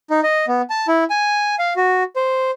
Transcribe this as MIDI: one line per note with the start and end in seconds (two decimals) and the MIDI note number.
0.10 0.20 63
0.23 0.46 75
0.48 0.62 59
0.70 0.87 81
0.88 1.04 64
1.10 1.55 80
1.59 1.73 77
1.76 2.03 66
2.16 2.51 72